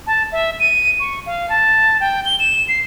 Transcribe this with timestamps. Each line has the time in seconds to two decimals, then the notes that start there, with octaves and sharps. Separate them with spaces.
0.07 A5
0.32 E5
0.60 D#7
1.00 C#6
1.26 F5
1.49 A5
2.00 G5
2.25 G7
2.40 E7
2.69 C7